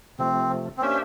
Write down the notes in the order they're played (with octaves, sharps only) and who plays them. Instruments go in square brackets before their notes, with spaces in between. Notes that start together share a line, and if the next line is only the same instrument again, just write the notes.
[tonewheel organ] C3 F3 A3 [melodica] C4
[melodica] C4
[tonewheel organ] A#3 D4 G4 C5 E5 [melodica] C#4